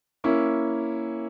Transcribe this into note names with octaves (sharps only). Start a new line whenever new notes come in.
A#3 C#4 E4